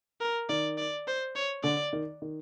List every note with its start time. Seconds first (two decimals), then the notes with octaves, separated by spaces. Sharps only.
0.21 A#4
0.49 D#3 D5
0.78 D5
1.07 C5
1.36 C#5
1.64 D3 D5
1.93 D#3
2.22 D#3